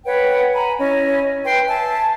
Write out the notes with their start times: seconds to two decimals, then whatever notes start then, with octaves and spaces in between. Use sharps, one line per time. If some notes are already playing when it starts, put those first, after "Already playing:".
0.06 B4 C#5 F#5 G5
0.54 G#5 A#5 B5
0.79 C#4 E4 C#5 D#5
1.44 B4 G5 C6
1.68 E5 G#5 A5